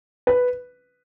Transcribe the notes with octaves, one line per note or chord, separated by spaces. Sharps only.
B4